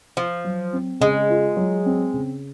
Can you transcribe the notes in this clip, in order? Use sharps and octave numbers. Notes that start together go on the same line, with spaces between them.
F3 F4
F#3
C4
C#3 G#3
F4
F#3
C4
C#3